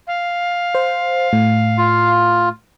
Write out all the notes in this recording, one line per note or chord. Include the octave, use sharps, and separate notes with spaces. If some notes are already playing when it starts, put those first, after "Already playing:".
F5
C5
A2
F4